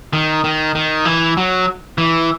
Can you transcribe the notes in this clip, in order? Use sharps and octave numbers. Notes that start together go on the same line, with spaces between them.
D#3
D#3
D#3
E3
F#3
E3